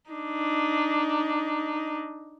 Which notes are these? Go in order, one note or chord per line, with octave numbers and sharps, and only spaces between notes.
D4 D#4